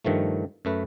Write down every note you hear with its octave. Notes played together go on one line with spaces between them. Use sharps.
G2 D#3 F3 A3
F#2 A3 B4